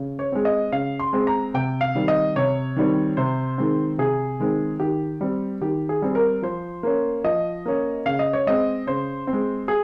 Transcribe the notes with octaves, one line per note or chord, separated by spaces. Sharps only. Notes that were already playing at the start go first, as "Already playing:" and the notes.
Already playing: C#3
C#5
G#3 C4
D#5
C#3 F5
C6
G#3 C4
A#5
C3 G5
F5
D#3 G3 C4
D#5
C3 C#5
D#3 G3 C4
C3 C5
D#3 G#3 C4
C3 G#4
D#3 G#3 C4
D#3 G4
G3 C4
D#3 G4
G#4
G3 C4
A#4
F3 C5
A#3 C#4
F3 D#5
A#3 C#4
C#3 F5
D#5
C#5
G#3 C4 D#5
C#3 C5
C4
G#3
G#4